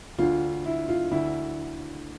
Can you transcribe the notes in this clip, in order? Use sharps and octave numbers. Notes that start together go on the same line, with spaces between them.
D2 D3 F4
E4
F4
D2 D3 E4